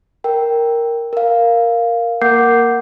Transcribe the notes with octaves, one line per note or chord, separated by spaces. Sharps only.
A#4 G5
A#4 F5
A#3 A#4 F#5 D6 G6 C7